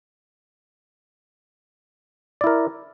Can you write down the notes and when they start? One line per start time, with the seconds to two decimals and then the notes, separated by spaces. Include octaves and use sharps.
2.41 D5
2.44 E4
2.47 A#4